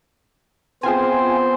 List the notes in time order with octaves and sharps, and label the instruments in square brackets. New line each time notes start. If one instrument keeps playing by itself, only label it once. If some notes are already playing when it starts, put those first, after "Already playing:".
[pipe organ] B3 C5 [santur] C4 G#4 [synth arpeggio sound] F4 G#5